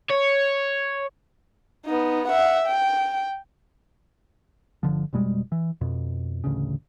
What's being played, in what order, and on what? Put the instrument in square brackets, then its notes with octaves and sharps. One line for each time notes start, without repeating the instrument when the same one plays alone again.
[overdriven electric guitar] C#5
[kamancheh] B3 D#4
E5 F#5
G5
[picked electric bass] G1 C2 D3 F3
F1 B2 G3 G#3
E3
F2 B2
A1 D2 C#3